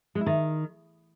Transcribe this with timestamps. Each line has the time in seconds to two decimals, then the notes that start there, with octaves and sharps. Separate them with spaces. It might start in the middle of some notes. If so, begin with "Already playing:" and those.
0.15 G#3
0.21 E4
0.26 D#3